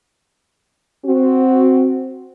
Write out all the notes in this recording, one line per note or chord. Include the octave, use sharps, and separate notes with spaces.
C4 F#4